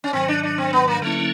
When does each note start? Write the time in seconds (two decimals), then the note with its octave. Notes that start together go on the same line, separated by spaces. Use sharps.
0.04 C#4
0.13 G#2 D#3 F#3 C4
0.28 D4
0.43 D4
0.58 C4
0.73 B3
0.87 A#3
1.02 D3 F#3 A3 A#3 C#4 E4